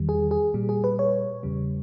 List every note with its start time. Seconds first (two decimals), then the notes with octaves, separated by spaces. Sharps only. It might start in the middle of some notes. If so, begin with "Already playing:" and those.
Already playing: E2 D#3 G3
0.09 G#4
0.31 G#4
0.54 A#2 G3
0.69 G#4
0.84 B4
0.99 C#5
1.43 E2 C#3 G3